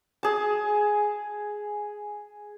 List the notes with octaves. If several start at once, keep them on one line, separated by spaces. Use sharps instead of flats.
G#4 A5